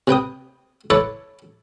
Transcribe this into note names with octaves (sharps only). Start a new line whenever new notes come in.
C3 B4 G5 D#6
E4 A4 B4 C#5 A5 D6